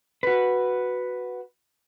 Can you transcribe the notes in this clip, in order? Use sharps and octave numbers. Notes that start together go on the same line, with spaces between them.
F#4 B4